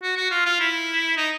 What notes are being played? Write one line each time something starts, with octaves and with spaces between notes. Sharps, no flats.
F#4
F#4
F4
F4
E4
D#4